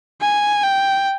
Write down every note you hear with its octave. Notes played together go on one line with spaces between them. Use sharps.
G#5
G5